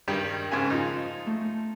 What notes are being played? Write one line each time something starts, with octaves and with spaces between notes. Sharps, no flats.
G2 D#3 G3
G#2 C#3 G#5
F3 D#4
A3